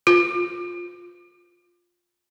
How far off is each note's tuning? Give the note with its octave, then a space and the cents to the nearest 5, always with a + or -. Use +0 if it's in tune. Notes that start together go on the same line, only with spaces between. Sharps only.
F4 +10